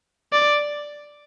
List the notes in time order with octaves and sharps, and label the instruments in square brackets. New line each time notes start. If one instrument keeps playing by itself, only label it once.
[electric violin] D5